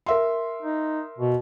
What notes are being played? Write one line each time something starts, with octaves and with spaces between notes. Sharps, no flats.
A#4 E5 C6
D#4
B2